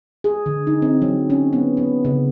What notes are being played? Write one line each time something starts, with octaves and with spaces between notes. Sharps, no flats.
G#4
D3
D#4
C4
F#3
C#4
B3
B3
C#3